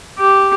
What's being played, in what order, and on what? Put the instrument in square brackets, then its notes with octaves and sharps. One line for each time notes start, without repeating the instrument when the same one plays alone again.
[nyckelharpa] G4